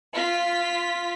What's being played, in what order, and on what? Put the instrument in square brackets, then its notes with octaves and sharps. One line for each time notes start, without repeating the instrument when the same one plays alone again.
[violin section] F4 B6